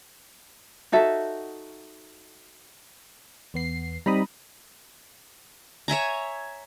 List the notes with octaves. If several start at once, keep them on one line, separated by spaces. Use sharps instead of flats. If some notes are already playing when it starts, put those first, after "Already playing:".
D#4 F#4 A4 E5
E2 B3 C7
G3 C4 D#4 A#5 B5 D#6
C#5 E5 G#5 A#5